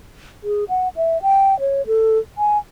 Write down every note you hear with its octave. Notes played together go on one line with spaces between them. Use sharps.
G#4
F#5
E5
G5
C#5
A4
G#5